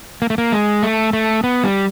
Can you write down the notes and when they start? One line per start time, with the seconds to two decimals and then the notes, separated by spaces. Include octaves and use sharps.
0.22 A#3
0.30 A3
0.38 A#3
0.52 G#3
0.83 A3
1.13 A3
1.44 B3
1.64 G3